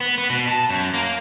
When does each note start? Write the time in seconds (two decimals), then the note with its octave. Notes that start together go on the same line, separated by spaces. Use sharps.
0.01 B3
0.18 B3
0.30 B2
0.48 A5
0.70 F#2
0.94 A#3